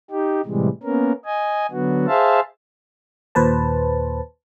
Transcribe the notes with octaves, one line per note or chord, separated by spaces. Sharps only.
D#4 G4
A2 C3 E3 G3 G#3
A#3 B3 C#4 A#4
D#5 G#5
D3 F#3 B3 F#4
G#4 C5 E5 F5 A5
D#2 A#2 B4 C5 A5